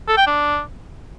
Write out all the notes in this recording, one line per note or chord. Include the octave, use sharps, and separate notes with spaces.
A4
G5
D4